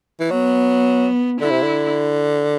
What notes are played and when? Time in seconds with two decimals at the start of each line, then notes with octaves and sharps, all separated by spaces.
0.20 E3
0.31 F#3 B3
1.41 D3 E4
1.50 C3
1.62 D3